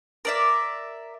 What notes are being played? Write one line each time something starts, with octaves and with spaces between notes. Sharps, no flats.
A#4 D5 E5